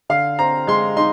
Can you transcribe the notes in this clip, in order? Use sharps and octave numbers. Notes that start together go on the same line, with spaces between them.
D3 F5
C4 A#5
G#3 C6
D#4 C6